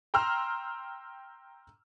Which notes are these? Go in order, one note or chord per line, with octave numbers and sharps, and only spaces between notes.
G5 A#5 C6 E6 F6